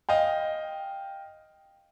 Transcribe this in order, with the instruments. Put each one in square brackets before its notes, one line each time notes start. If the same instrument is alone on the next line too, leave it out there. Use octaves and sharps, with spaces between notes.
[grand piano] D#5 F5 G5